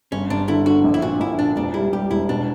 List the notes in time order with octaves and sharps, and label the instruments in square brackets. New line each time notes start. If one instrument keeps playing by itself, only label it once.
[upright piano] G1 [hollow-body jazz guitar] C#4
[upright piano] G1 [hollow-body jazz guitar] D4
[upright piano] D3 [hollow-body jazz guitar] E4
[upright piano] D3 [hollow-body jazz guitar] F#4
[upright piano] A#1
[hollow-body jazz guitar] E4
[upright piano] A#2 [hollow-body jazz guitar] F#4
[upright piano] A#1 [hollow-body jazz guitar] E4
[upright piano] A#2 [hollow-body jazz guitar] D4
[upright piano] E1 [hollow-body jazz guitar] D4
[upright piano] G3 [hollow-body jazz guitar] E4
[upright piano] G3 [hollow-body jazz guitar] G4
[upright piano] E1 [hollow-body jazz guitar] E4
[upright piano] B2 [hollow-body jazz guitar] D4